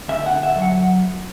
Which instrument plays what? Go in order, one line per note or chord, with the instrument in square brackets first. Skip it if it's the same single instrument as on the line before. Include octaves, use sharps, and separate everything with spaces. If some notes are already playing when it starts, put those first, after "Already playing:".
[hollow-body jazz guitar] D2 E5
F#5
D3
E5
F#3
F#5